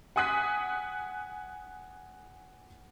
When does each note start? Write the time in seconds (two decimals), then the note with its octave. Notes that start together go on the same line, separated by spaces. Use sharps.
0.16 F#5 G#5 D#6 F#6 B6